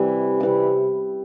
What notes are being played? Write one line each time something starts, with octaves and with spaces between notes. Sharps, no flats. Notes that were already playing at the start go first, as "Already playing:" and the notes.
Already playing: C3 E3 G3 E4
C3 E3 G3 E4